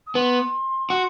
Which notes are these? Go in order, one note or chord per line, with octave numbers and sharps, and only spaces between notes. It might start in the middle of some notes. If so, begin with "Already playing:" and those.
D#6
B3 C6
F#4